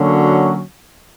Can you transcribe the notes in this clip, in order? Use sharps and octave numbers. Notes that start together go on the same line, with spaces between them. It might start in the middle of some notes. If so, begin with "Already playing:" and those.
Already playing: D3 F#3 A#3 C#4 F#4